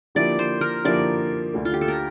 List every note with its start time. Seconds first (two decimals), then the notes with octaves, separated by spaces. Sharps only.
0.15 D3 F3 A#3 E4 G4 D5
0.39 C5
0.61 A#4
0.85 D3 F3 A#3 E4 G4 D5
1.54 D2 D3 A3
1.65 F4
1.73 G4
1.81 A4
1.88 A#4